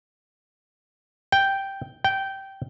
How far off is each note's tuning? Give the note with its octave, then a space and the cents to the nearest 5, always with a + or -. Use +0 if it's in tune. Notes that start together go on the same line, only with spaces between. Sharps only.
G5 -5
G5 -15